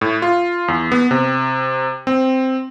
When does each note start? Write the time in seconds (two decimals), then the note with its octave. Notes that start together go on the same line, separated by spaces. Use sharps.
0.01 A2
0.22 F4
0.68 E2
0.92 B3
1.11 C3
2.07 C4